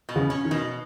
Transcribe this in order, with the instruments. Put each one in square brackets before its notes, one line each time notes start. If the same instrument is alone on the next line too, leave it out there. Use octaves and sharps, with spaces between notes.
[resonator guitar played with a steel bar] B2
[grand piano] C#3
[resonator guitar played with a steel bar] C#4
[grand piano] D#3
[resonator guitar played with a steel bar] B2